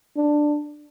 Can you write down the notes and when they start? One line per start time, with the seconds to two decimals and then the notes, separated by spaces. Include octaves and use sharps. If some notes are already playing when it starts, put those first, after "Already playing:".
0.17 D4